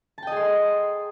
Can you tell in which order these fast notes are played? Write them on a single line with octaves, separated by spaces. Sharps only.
A5 G5 D#5 G#4 C6